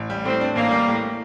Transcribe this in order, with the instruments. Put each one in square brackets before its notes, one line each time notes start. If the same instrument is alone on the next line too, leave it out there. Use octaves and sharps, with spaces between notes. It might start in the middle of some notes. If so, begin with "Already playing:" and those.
Already playing: [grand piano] A1
G3
[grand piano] A2 [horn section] C4
[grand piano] D4
[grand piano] A1 [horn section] A#3
[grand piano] G3
A2